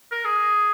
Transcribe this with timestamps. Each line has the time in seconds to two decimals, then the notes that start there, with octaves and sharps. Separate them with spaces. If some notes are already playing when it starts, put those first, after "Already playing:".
0.12 A#4
0.25 G#4